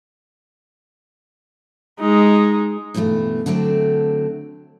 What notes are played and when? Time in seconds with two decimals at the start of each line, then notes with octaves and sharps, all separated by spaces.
2.00 G#3 D#4
2.94 G2 B2 E3 G#3 A3
3.46 D3 F#3 A3 C4 D4